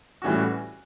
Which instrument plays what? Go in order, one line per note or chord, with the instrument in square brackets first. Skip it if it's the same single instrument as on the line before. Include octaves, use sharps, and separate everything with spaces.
[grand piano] A2 E3 G3 C#4 F#4